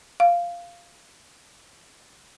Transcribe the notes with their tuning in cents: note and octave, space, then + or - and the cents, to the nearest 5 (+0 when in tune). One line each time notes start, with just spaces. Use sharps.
F5 -5